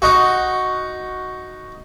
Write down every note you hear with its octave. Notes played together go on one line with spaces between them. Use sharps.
D#4 F#4